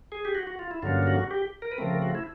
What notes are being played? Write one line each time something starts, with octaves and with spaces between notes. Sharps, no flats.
G#4
G4
F#4
F#4
F4
E4
G2 D3 F#3 A#3 C#4 F4
F4
F#4
G4
A#4
B4
C#3 F3 A3 C4 A#4
A#4
F#4
E4